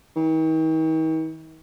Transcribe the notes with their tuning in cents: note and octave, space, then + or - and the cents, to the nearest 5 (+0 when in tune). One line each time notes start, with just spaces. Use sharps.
D#3 +45